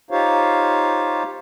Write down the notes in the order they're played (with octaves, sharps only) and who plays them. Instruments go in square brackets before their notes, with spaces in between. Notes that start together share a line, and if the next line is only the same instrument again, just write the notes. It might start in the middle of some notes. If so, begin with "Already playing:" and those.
[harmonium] D#4 F4 G4 C5 C#5 F5